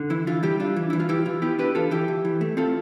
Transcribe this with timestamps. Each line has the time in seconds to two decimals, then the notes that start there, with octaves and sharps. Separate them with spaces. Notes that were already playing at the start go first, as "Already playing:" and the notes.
Already playing: D3
0.10 E3 E4
0.27 E3 F4
0.43 G3 E4 G4
0.60 D4 F4
0.76 E3
0.90 E3 E4
1.00 F4
1.09 E3 E4 G4
1.26 E3 F4
1.42 B3 E4 G4
1.59 D4 G4 B4
1.75 E3 F4 A4
1.91 E3 E4 G4
2.08 E3
2.25 E3
2.41 A3
2.57 C4 F4 A4